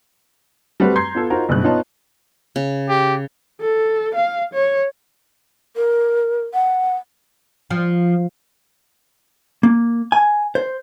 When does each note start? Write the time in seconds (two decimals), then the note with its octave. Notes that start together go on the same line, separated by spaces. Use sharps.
0.80 G3 A3 C4 F#4 B4
0.96 A#5 C6 G6 G#6 C7
1.15 B3 F4 A4
1.30 D#4 F4 F#4 A#4 C5
1.49 F#1 G2 B2 F#6
1.64 B3 D#4 F4 C#5 D#5 A5
2.56 C#3
2.89 G4
3.61 A4
4.14 F5
4.53 C#5
5.76 A#4
6.54 F#5
7.70 F3
9.63 A#3
10.12 G#5
10.55 C5